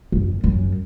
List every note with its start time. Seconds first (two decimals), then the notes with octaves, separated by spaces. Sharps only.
0.12 F#2
0.44 F#2